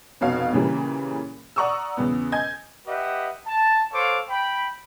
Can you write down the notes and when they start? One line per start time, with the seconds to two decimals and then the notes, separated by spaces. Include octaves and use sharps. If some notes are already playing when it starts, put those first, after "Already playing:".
0.21 F1 B2 F#4 C#5 F5
0.53 A#2 C#3 E3 G3 A#3
1.56 D5 F#5 A#5 C#6 D#6 E6
1.97 E2 C#3 B3
2.32 D#5 G#5 G6 G#6
2.87 G4 B4 D#5 E5 F#5
3.47 A5
3.93 A4 C5 C#5 F5 D6
4.29 G5 B5